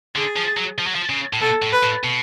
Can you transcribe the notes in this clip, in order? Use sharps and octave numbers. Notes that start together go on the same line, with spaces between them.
D3 G#4
F3
F#3
F3
F#3
F3
C#3
A2
B2 A4
A2
B4
A2
B2